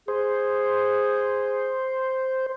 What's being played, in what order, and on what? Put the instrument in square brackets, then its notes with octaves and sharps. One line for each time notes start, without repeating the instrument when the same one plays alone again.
[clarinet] G#4 [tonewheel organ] C5